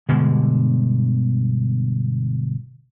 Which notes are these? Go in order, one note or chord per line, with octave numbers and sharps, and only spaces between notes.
G1 B2 D3 G#3